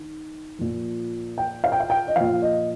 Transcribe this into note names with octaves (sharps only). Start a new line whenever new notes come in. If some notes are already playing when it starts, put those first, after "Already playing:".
Already playing: D#3
A#2 F3
G5
F5
G5
F5
G5
D#5
A#2 F3 F5
D#5